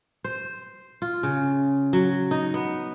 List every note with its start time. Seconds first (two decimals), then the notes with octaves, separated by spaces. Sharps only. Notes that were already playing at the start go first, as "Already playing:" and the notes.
0.24 C5
1.02 F4
1.23 C#3
1.93 F#3
2.31 D#4
2.54 B3